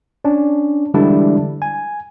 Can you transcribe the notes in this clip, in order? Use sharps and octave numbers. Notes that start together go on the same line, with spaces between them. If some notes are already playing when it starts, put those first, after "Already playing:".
C#4 D4
D3 E3 G3 G#3 D4 E4
G#5